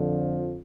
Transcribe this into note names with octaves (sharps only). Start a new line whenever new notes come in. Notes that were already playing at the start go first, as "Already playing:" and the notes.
Already playing: F2 D3 F3